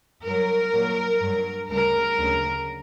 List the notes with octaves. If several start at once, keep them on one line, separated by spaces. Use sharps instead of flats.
G2 F#3 A#4
A#2 F#3
G2 F#3
D2 C#3 G3 A#4
D2 C#3 F#3